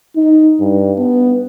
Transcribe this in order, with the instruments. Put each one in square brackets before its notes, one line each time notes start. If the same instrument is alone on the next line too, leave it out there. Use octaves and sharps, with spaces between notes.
[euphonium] D#4
G2
B3